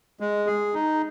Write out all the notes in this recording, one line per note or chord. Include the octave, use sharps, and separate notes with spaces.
G#3
G#4
D#4